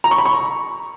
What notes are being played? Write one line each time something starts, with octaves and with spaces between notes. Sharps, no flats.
A#5
C#6
B5
C#6